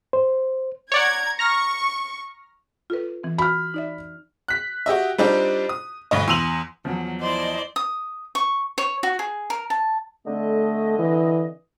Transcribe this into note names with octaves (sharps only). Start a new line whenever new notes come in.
C5
C#5 D5 F#5 A#5 G#6
A#5 C#6 F6 A#6
F4 A4 B4
E3 C4
F#4 B5 F6
D#4 D5 E5
F#6 B6
F#4 G4 D#5 E5
G3 C4 D4 D#4 F4 G4
D#6
D2 G2 D#5
E2 C6 E6 D#7 F7 F#7
E2 F3 F#3
E4 C5 D5 D#5 C6
D#6
C#6
C#5
F#4
G#4
A#4
A5
D3 A3 C4 D#5
E3